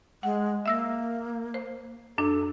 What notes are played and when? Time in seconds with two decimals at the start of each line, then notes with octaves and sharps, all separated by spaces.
0.23 G#3 F#5
0.66 A#3 E5 E6 A#6
1.54 C5
2.18 F#2 D4 A4